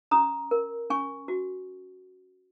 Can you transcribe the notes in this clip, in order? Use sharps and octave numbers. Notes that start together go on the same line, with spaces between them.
C#4 A#5 D#6
A#4
C#4 G#5 C#6
F#4